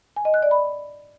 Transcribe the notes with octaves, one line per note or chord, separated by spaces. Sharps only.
G#5
D#5
F#6
D5
B5